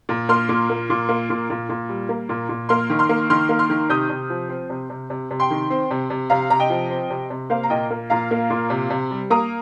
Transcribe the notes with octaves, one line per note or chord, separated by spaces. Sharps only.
A#2
A#3 C6 F6
A#2
A#3
A#2
A#3
A#2
A#2
A#2
G3
A#3
A#2
A#2
A#3 C6 F6
D#3
C6 F6
A#3
D#3 C6 F6
A#3
C6 F6
D#3
C3 D#6 G6
C3
F3
C4
C3
C3
C3
C3
G5 C6
D#3
C4
C3
C3
C3 F5 A#5
C3 A#5
D#5 G5
F3
C4
C3
C3
A#3 C5 F5
A#5
A#2 D#5 G5
A#3
A#2 F5 A#5
A#3
A#2
C3
C3
G3
A#3 A#5 D#6